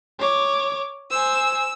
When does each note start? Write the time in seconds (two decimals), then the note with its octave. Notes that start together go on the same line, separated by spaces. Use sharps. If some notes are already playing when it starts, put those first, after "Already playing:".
0.19 C#5 D6
1.11 C5 G#5 E6